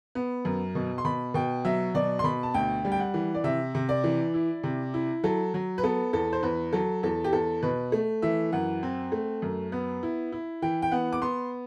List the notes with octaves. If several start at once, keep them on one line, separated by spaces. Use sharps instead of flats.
B3
F#2
B2
C6
B2 B5
B2 G5
F#3 E5
B2 D5
C6
B2 B5
A5
D2 G5
G3
G5
F#5
E3
D5
C3 E5
C3
D5
E3
E4
C3
E4
F#3 A4
F#3
B4
B3 A4
E2 A4
C5
E2 B4
F#3 A4
E2 A4
G4
E2 A4
B2 B4
A3
E3 E5
F#2 F#5
C4
A3
F#2
B3
E4
E4
E3 G5
G5
B3 F#5
D6
B3 C6